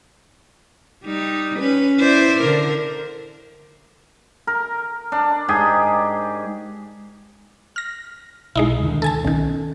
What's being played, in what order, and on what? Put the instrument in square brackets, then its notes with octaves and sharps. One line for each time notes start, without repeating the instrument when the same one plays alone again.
[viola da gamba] G3 D#4
C#4 B4
E4 C5 D5
D3 A#4
[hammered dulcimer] A#4
D4
G#2 G4 G#4
[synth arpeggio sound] F6 A#6
[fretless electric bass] B1 [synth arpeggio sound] G#3 D#4 E4
[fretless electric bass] D2 D3 D#3
[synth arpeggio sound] A4 G#5 A5
[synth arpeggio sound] B1 D#3 [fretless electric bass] C#4